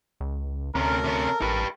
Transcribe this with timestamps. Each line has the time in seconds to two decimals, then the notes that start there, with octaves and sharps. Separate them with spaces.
0.21 C#2
0.75 D2 C3 C#4 A4 A#4
1.04 C3 C#4
1.42 A1 G4 B4